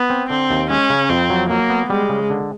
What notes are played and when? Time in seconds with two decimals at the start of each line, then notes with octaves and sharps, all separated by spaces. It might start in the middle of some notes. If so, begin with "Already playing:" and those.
Already playing: B3
0.10 C4
0.30 D3 C4
0.50 D#2
0.70 G#3 C#4
0.90 C#3
1.10 F2 C4
1.30 F#3
1.49 F#3 A#3
1.70 B3
1.90 G3 G#3
2.09 C#3
2.30 D3